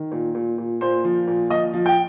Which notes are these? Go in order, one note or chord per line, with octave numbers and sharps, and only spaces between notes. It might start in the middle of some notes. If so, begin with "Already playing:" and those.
Already playing: D#3
A#2
A#2
A#2
A#2 C5
F3
A#2
F3 D#5
F3
G5